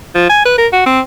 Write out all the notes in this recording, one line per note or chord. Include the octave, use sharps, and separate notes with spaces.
F3
G#5
B4
A#4
F#4
C4